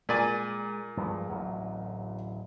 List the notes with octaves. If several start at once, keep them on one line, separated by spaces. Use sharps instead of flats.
A#2 G#3 D5 G#5
G2 F3 G#3
D1 A1 F#3